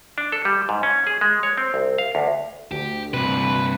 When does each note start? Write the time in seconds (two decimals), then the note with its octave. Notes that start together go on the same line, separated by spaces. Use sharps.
0.18 D4
0.32 A4
0.45 G3
0.69 G#2
0.83 C#4
1.07 G#4
1.21 G#3
1.43 C#5
1.58 C4
1.74 C2
1.98 F5
2.15 D2
2.71 D2 G4
3.14 G2 C3 B4